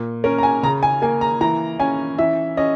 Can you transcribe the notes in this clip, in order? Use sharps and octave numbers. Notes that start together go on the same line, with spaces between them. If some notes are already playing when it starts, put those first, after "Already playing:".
Already playing: A#2
C#4 A#4
A#5
G#5
C#3 A#5
G#5
A#3 G#5
A#5
E3 A#5
C#4 G#5
E3 E5
C#4 D#5